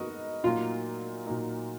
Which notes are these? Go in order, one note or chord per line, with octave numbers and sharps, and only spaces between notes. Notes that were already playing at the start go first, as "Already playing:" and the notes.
Already playing: B3 D#4 F#4 A#4 D#5
A#2 F#3 A#3 D#4 F4
A#2 F#3 A#3 D#4